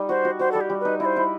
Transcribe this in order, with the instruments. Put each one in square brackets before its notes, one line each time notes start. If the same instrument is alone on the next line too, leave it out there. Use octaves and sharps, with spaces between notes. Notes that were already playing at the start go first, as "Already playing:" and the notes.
Already playing: [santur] G3 D#4
[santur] F#4 [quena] C5
[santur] F#4
[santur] F#4 [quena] C5
[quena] A4
[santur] G3
[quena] G4
[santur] G3
[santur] D#4 [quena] B4
[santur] E4 [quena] D#5
[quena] C5
[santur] E4